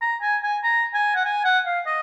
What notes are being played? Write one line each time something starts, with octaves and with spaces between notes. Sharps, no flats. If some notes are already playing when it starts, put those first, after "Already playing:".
A#5
G#5
G#5
A#5
G#5
F#5
G#5
F#5
F5
D#5